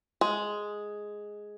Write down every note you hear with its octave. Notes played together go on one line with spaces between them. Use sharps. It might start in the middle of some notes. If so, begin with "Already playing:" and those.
G#3